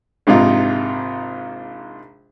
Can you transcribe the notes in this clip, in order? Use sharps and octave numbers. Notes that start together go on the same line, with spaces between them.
A#1 G#2 C3 D#4 F4